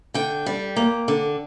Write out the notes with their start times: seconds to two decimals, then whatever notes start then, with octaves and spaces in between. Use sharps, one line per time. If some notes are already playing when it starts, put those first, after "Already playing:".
0.14 D3 G5
0.46 G3
0.76 A#3
1.08 D3